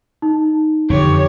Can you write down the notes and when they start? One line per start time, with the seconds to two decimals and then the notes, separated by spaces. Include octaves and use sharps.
0.22 D#4
0.90 F2 D3 E3 G4 C#5